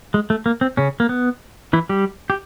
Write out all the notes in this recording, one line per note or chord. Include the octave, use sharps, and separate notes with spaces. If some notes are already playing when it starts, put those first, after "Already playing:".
G#3
A3
A#3
C4
C#3 C#4
A#3
B3
E3 E4
G3 G4
G4